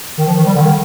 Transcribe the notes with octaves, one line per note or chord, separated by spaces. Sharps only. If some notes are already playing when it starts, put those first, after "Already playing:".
D#3
F3
D#3
G3
D3
D#3